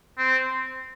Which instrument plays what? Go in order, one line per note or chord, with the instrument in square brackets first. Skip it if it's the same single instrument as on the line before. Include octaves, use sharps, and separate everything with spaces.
[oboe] C4